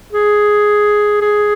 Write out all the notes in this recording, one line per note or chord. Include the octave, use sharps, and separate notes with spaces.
G#4
G#4